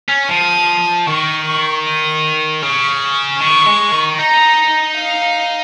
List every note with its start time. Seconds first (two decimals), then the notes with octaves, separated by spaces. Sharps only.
0.09 C#4
0.28 F3 D#6
1.07 D#3 C#6
1.45 C#6
1.84 D#6
2.62 C#3 C#6
3.40 D#3 C#6
3.66 G#3
3.92 D#3
4.18 D#4 A#5
4.96 F5